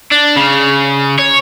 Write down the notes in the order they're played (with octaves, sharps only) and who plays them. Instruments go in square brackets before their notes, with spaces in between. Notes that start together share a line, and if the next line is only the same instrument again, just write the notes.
[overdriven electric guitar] D4
C#3
C#5